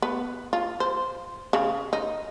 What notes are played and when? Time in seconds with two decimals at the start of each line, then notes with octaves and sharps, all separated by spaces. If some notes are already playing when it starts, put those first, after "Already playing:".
0.02 B3
0.53 F4
0.80 C5
1.53 C#3
1.93 D#4